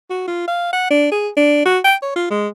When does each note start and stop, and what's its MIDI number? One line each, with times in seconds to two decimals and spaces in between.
0.10 0.25 66
0.28 0.46 65
0.48 0.72 77
0.73 0.90 78
0.90 1.11 62
1.12 1.28 68
1.37 1.64 62
1.65 1.79 66
1.84 1.95 79
2.02 2.11 73
2.16 2.28 65
2.30 2.48 56